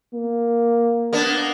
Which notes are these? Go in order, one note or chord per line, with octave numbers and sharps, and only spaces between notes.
A#3
A#3 B3 D4